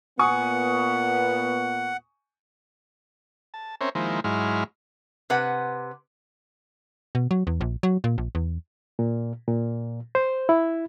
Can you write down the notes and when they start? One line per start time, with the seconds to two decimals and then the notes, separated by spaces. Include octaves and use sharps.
0.19 A#2 B3 F#5 G#5 C#6 D#6
3.54 A5
3.81 C4 C#4 A#4 C5 C#5 E5
3.95 D#3 F3 G#3 A#3 E4 C5
4.24 G#2 F#3 G#3 E4 C6 F6
5.30 C3 B4 F#5
7.15 B2
7.31 F#3
7.47 E2
7.61 A#1
7.83 F#3
8.04 A#2
8.18 A#1
8.35 E2
8.99 A#2
9.48 A#2
10.15 C5
10.49 E4